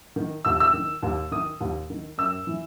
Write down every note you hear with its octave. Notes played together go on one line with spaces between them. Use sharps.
D#3
D#2 E6
E6
D#3
D#2
D#3 D#6
D#2
D#3
F#2 E6
E3